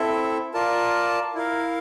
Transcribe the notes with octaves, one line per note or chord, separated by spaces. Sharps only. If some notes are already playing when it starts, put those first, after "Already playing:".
Already playing: C4 E4 A4 E5
F4 A#4 D5 A5
E4 A#4 F5